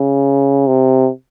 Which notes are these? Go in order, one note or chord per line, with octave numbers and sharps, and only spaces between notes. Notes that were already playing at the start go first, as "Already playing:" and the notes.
Already playing: C#3
C3